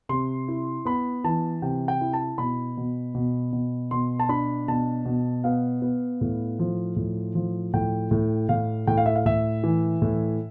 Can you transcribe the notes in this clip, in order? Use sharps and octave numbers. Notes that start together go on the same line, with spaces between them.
C3 C6
E4
B3 B5
E3 A5
C3 G5
G5
E4
A5
B2 B5
B2
B2
B2
B2 C6
A5
D4 B5
B2 A5
B2
B3 F5
B3
A2
F3
A2
F3
A2 G5
A2
A2 F5
A2 G5
F5
E5
F5
A2 E5
E3
A2